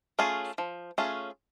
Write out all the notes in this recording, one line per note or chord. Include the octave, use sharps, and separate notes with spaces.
A3 C#4 F4 G#4
F3
A3 C#4 F4 G#4